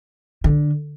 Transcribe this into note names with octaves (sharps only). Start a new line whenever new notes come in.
D3